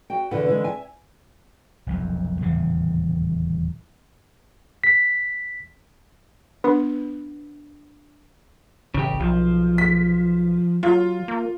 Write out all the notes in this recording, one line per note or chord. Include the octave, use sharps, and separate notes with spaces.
F#4 G5
E2 B2 D3 E3 B4 F#5
D3 E3 G#3
E5 G#5
F1 B1 F2
D#1 E2 A2 C#3
B6
B3 D4
A1 C#3 G4
B1 F3
B6
F#3 F4
A#3